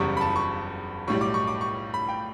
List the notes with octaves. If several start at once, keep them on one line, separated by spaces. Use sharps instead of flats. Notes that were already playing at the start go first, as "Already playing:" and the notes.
Already playing: F#1 E2 C#3 G3 C#6
B5
A5
C#6
B1 A2 G3 C#6
D6
C#6
D6
C#6
B5
G5